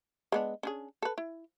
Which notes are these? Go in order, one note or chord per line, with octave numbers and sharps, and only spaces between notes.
G#3 B3 D4
C#4 D4 G#4
A4 B4
E4